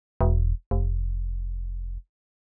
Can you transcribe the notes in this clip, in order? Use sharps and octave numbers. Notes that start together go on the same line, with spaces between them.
E1
F1